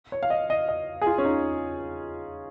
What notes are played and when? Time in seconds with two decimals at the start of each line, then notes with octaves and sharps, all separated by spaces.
0.12 C#5
0.23 F5
0.30 D#5
0.50 D#5
0.68 D#5
1.02 G#4
1.06 F4
1.18 C#4
1.25 D#4